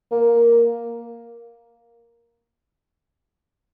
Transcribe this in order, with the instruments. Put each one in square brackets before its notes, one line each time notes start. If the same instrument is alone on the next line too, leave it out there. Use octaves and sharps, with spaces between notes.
[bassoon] A#3